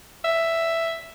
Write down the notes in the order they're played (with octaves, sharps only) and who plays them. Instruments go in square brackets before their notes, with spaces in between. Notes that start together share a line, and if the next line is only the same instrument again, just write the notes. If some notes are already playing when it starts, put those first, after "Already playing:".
[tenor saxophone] E5